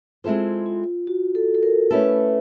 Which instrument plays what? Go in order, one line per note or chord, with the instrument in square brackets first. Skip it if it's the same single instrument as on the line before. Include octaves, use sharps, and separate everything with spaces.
[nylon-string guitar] G#3 C4 E4 A4 C5 [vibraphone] F4
[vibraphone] F4
F#4
A4
A4
A#4
[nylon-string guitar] A3 C#4 E4 A4 [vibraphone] B4